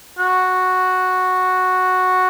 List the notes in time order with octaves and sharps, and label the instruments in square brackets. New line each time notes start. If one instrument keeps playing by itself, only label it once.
[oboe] F#4